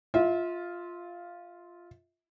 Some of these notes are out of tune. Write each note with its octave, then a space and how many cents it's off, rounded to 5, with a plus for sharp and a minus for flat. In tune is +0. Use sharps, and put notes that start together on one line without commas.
F4 +0 E5 -30